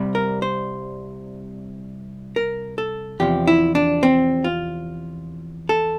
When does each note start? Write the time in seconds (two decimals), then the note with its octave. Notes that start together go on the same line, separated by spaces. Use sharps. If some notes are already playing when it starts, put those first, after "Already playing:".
Already playing: C2 C3 G3
0.15 A#4
0.42 C5
2.36 A#4
2.78 A4
3.20 E2 C3 F3 G4
3.47 E4
3.75 D4
4.03 C4
4.44 F4
5.69 A4